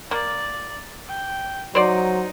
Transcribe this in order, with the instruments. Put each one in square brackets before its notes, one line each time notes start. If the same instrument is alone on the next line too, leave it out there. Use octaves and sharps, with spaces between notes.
[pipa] A#3 [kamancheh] D5
[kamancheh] G5
[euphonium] F#3 [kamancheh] D#4 [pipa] C5 D5